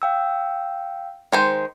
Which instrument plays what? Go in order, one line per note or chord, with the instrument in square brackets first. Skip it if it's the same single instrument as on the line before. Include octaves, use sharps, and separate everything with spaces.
[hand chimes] F5 G5 E6
[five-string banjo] D#3 G#3 C5